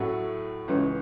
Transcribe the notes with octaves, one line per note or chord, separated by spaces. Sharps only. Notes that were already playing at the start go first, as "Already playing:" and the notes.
Already playing: A2 F#3 A3 F#4
C#2 C#3 E3 C#4